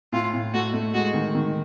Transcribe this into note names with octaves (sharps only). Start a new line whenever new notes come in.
A2 F4
A2
A3 F#4
A3
G#3 F#4
D#3
D#3